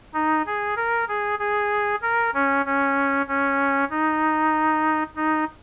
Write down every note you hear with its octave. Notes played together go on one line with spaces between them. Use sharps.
D#4
G#4
A#4
G#4
G#4
A#4
C#4
C#4
C#4
D#4
D#4